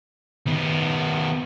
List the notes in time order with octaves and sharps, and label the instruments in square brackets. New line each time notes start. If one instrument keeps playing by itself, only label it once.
[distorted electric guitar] D#3 B3